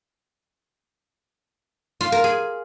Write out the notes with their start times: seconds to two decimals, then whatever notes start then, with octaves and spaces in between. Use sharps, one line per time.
2.01 F4
2.12 A#4
2.24 G#4